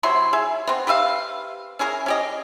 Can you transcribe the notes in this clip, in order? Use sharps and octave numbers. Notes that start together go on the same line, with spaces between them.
C3 F#3 E4 C6
G#4 E5
B3 C4
G4 B4 E5 F5
C#4 E4 G#4 A#4
C#4 G4 D#5